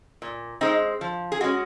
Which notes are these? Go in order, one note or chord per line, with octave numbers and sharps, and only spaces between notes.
A#2
G#3 C4 D#4
F3
G#4
G#3 C#4 F#4